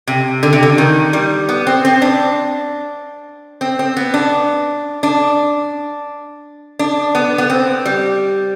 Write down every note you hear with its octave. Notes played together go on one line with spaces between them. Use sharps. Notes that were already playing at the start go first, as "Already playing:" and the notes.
C3
D3
C3
D3
D#3
G3
B3
C4
C4
D4
C4
C4
B3
D4
D4
D4
B3
B3
C4
G3